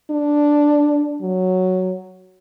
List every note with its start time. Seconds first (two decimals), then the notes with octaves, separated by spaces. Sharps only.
0.11 D4
1.22 F#3